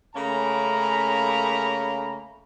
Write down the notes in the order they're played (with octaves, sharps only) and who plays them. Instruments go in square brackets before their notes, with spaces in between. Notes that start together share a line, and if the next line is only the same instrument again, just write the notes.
[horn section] C#3 A3 A#3 C#4 A#5 B5